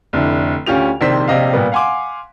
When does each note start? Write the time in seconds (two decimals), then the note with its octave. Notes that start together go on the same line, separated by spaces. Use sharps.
0.13 F1 D3 E4
0.66 D2 C#4 F4 G4 F7
1.01 A#1 C3 D#3 C5 C6 B6
1.28 A#1 C3 D#5 F5
1.53 A#2 G3 B3
1.72 F5 F#5 G#5 C6 D6